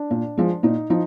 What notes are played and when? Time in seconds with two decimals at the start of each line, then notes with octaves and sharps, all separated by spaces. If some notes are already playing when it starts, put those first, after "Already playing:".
Already playing: D4
0.10 A#2
0.37 F3 G#3
0.63 A#2 D#4
0.90 F3 D#4